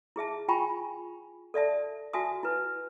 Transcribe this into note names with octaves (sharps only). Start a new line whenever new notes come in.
E4 G#4 E5 A5
F4 G5 G#5 A#5 B5 C#6
A4 D5 E5 A5
F#4 E5 G#5 A5 D#6
E4 B4